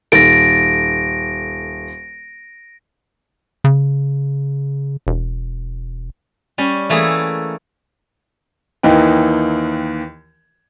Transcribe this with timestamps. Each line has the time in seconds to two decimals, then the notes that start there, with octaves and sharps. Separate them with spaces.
0.12 D#1 A4 A6 A#6 D7
3.64 C#3
5.07 E1
6.58 G3 C#4
6.89 E3 A3 A#3 G#4 A4
8.83 D#2 E3 D#4 G5